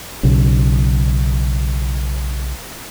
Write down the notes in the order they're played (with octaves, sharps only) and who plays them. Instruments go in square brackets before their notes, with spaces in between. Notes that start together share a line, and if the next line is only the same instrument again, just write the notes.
[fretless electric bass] B1 C#3